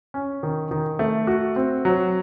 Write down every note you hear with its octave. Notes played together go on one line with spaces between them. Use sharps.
C#4
D#3
D#3
A3
F#4
C4
F#3